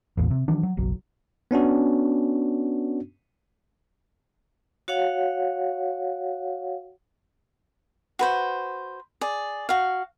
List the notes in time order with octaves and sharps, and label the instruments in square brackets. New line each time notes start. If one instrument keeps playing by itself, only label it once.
[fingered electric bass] A1 E2 A#2
C3
D#3 E3 F#3 D4
F#3
F#1 B1 F#3
[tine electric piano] B3 C#4 D4 F#4
[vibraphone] F#4 C#5 F5 F#5
[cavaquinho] F#4 B4 C5
G#4 D5
F#4 F5